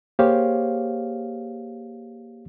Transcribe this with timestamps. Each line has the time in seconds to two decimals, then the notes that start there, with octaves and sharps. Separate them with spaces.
0.19 A#3 G4 G#4 C5 C#5 F5